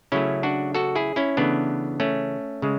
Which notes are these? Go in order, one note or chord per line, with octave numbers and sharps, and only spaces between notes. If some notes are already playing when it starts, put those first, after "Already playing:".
C#3 F#3 A3 C#4 E4
D4 F#4
F#4 A4
E4 G#4
C#4 E4
C#3 E3 A3 B3 D4
A3 C#4
C#3 G#3